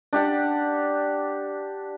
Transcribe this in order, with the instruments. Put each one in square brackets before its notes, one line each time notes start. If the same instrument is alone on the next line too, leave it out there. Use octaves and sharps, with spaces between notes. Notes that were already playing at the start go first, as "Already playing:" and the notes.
[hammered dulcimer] D4 G4 F#5